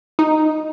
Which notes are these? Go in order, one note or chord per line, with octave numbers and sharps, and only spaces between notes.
D#4